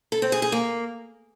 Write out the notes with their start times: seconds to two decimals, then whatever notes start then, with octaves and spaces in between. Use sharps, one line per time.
0.12 A4
0.22 C4
0.32 G#4
0.42 G#4
0.52 A#3